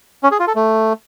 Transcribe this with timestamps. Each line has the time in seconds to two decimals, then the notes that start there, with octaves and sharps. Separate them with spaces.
0.23 C#4
0.31 G#4
0.39 F4
0.48 A4
0.56 A3